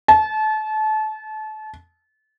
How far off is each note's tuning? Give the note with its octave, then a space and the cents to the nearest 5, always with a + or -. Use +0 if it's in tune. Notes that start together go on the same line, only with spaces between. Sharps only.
A5 -30